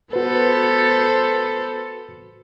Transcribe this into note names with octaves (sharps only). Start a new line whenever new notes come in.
B3 F#4 A4 B4 C5